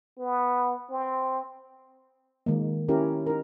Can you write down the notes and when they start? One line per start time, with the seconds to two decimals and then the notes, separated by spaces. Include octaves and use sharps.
0.19 B3
0.90 C4
2.46 D#3 G#3 A#3
2.88 C#4 E4 G4 A#4
3.26 D#4 A#4